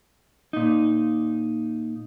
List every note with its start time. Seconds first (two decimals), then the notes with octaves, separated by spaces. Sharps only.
0.53 A#2 D#4